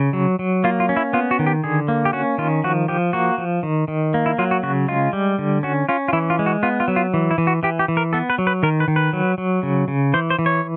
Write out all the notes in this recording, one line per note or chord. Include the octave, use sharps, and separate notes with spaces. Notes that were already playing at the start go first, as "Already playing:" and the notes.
Already playing: C#3
F#3
F#3
A#3 F4
F4
C#4
E4
B3 F4
F#4
D#3
G4
D3 G#4
A#3
G4
C#4 F#4
D#3 F4
F3 F#4
F3 G4
A#3 F#4
F3
D#3
D#3
A#3
E4
F#3 F4
F#4
C#3 F#4
G#3 F4
G3
D3
C#4 F#4
C#4 F4
F4
E3 E4
F4
G#3
F#4
B3 F4
F4
F#3
F4
E3
E4
E3
F#4
E3 G4
G4
E3
A#4
B3 A4
B4
F#3
B4
D#3 A#4
B4
D#3
B4
F#3
F#3
C#3
C#3
E3 C5
C5
E3
C#5